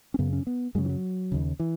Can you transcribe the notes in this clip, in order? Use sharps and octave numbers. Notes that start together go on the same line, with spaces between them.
C#4
F#2 C#3 B3
C#4
B3
F#2 C#3 G#3
E3
F#3
D#2 C#3
E3